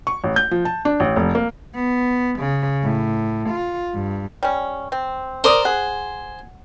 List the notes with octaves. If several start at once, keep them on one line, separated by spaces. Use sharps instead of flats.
C#6
A1
G6
F3
A5
D4
A1
F1
A#3
B3
C#3
A2
F4
G2
G3 C#4
C4
A#4 C5 D5 D#6
G#4 F#5